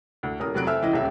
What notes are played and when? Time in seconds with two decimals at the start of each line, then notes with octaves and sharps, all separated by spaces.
0.23 D2
0.40 D#1 A#4 D#6
0.54 F1 F#3 F#6 D7
0.67 A4 C5 E5 G#5 E6 F6
0.82 C#2 E3 D#5
0.93 D#1 C#2 E5